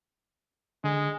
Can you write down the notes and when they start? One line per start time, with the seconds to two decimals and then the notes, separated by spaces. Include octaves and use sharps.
0.84 D3 G#3